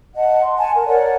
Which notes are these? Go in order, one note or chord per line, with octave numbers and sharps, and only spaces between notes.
D#5 F#5 A5
C6
F#5 G#5 A5
A#4
A#4 C#5 D5 F#5